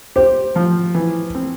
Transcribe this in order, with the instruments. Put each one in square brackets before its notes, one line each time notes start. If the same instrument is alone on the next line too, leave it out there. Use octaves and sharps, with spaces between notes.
[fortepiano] G4 [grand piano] C5
[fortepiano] F3
E3
C4